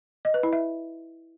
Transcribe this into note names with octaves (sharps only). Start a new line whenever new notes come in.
D#5
B4
E4
E5